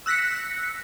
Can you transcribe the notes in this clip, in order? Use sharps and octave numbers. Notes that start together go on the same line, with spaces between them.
E6 F#6 A#6 B6 C#7